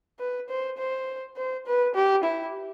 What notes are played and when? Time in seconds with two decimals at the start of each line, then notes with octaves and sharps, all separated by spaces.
0.19 B4
0.49 C5
0.78 C5
1.37 C5
1.66 B4
1.95 G4
2.24 E4